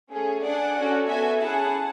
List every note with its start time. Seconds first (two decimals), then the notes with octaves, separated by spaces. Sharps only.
0.10 A3 C#4 G#4
0.43 D4 G#4 D5 F#5
0.76 C#4 F#4 A4
1.07 B3 F#4 A4 E5 G#5
1.40 C#4 E4 G#4 F#5 A5